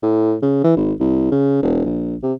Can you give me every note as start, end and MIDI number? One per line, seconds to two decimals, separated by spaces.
0.03 0.35 45
0.42 0.62 49
0.64 0.75 52
0.76 0.92 32
1.00 1.28 36
1.31 1.60 49
1.62 1.85 28
1.86 2.16 34
2.23 2.33 48